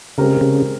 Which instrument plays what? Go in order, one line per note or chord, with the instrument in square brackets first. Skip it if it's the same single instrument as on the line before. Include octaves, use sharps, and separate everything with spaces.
[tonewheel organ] C#3 [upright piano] G#3 C4 G4 A#4
[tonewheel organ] C#3